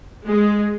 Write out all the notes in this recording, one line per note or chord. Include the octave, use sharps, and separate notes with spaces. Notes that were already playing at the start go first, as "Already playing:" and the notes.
G#3